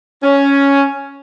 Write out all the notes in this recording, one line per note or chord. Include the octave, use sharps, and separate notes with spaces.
C#4